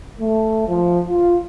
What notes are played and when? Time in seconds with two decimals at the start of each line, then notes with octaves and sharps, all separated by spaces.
0.20 A3
0.68 F3
1.08 F4